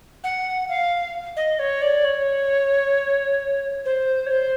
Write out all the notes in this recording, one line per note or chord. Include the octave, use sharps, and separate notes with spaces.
F#5
F5
D#5
C#5
D5
C#5
C5
C#5
C5